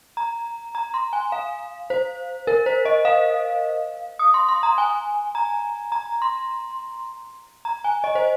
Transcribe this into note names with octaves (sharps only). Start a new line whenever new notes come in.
A#5
A#5
C6
G#5
F5
C5
A#4
C5
D#5
F5
D#6
C6
C6
A#5
G#5
A#5
A#5
C6
A#5
G#5
D#5
C5